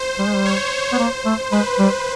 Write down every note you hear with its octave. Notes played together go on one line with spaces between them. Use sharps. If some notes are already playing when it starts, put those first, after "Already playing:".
Already playing: C5
G3
G#3
G3
C#5
B3
A#3 C5
A3
G#3 B4
G3